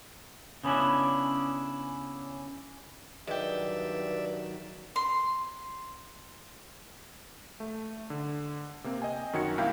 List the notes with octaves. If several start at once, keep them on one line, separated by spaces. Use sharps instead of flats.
C#3 B3 C#4 D4 E4
G2 D#3 F#3 G#3 G4 D5 E5
C6
A3
D3
C3 A#3 C4
D#5 G5 G#5
F#2 D#3 F#4 G#6 C#7
C2 A#3 E4 F5 G5 G6